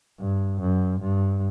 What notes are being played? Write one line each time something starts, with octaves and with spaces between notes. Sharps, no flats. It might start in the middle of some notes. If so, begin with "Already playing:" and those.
G2
F#2
G2